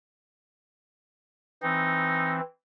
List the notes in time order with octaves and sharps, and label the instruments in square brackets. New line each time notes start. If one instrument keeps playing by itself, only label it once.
[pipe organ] E3 C4 [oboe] D#4